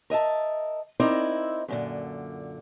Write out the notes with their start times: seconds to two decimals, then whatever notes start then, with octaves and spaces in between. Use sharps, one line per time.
0.10 A#4 D#5 E5 A5
1.00 C4 D#4 E4 A#4 D5
1.68 F#2 A#2 D3